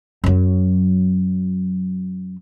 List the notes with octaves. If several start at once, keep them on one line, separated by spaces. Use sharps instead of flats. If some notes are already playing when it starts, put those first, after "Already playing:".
F#2 F#3